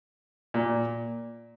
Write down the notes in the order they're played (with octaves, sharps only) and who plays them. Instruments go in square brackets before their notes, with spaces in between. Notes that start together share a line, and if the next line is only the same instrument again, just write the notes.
[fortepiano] A#2